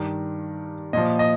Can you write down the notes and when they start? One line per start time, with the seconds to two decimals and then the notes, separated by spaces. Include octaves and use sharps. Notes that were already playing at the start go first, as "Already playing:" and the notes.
Already playing: G2 D#3
0.93 A#2 F3 D#5
1.19 D#5